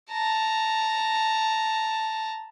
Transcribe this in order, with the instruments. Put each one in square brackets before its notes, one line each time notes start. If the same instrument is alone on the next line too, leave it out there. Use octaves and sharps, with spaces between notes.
[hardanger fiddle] A5 A#5